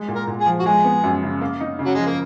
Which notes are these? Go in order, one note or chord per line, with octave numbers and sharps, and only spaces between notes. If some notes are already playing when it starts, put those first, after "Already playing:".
Already playing: G#3
A#2
A#4
A#2
G#4
F3
F#4
G#3 G#4
B3
F#2
C#3
A#3
D#4
C#3
F#3
F3 G#3
A#3